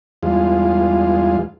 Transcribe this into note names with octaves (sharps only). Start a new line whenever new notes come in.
E2 G2 G#3 F4